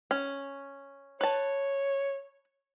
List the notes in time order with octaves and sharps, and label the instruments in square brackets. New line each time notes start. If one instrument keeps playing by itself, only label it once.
[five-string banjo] C#4
[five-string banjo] B4 A5 [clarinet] C#5